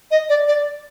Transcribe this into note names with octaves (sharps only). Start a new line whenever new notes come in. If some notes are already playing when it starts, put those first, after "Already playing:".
D#5
D5
D5